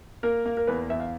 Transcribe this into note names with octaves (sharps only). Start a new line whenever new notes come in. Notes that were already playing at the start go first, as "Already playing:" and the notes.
A#3 A#4
A#3
A#4
E2 B4
E2 E5
F5